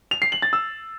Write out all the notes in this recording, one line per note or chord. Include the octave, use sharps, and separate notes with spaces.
F7
C7
F#7
A6
E6